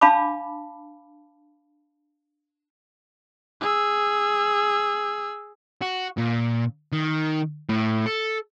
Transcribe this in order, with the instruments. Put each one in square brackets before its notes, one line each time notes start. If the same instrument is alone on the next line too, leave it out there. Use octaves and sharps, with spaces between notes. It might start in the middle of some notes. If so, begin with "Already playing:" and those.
[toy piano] D4 F5 A5 B5 D6
[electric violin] G#4 E6
[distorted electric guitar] F#4
A#2
D#3
A2
A4